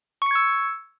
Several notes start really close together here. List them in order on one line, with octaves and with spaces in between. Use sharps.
C#6 C#7 G#6 E6